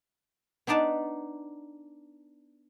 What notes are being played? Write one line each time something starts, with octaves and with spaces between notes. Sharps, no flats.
B3 D4 D#4 D5 A5